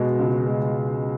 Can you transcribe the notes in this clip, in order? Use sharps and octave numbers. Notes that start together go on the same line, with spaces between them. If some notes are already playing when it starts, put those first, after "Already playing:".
Already playing: B2 G#3
C#2
B2 G#3